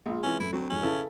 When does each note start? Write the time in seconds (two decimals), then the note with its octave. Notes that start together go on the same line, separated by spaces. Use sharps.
0.06 A#1 G#3 F4
0.23 C3 E3 C#4
0.40 F#2 A3 E4
0.53 D2 F#3 C4
0.70 F2 G#2 C#4
0.83 C#3 E4 A4 B4 A5